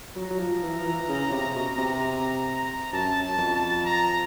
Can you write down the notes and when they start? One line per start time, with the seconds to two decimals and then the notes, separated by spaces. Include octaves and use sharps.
0.16 F#3 A#5
0.30 F#3
0.39 F3
0.63 E3
0.78 F3
0.85 E3
1.09 C#3
1.31 C3
1.55 B2
1.78 C3
2.93 F#2 A5
3.23 A5
3.38 F2
3.55 A5
3.85 A#5